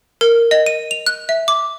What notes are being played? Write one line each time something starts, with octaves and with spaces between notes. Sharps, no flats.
A#4
D#5
D#7
F7
F#6
E5
D6